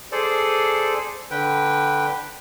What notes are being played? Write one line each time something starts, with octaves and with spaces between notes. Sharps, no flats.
G#4 A4 C5 D5
D3 B4 G5